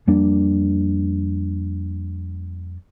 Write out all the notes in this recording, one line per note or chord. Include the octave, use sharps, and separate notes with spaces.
F2 G3 A#3 D4